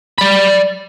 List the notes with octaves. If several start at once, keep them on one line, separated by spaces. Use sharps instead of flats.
D5 B5